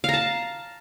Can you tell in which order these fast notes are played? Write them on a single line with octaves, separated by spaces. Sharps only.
F5 A#5 A5